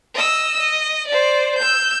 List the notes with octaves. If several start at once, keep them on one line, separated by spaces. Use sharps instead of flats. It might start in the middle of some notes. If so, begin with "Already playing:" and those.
D#5 E6
D#5
C5 D5
E6 G6